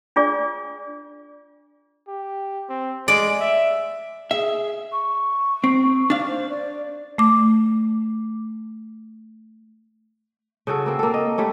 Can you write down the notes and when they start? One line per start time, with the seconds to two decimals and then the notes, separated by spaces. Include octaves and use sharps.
0.16 D4 F4 G#4 D5
2.08 G4
2.69 C4
3.08 G#3 D5
3.40 E5
4.31 G#4 E5
4.92 C#6
5.64 C4
6.10 D4 F5
6.27 C5
6.49 D5
7.18 A3 D6
10.67 C#3 C#4 F#4 A4
10.86 A#3 C4
10.99 A#3 A4
11.14 D#5
11.38 G3 A3 C#4